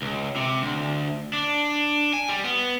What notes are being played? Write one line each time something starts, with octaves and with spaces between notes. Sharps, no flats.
C#2
C3
D2
D4
G#5
G3
B3